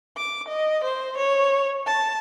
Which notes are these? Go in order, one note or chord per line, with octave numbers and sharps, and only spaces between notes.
D6
D#5
C5
C#5
A5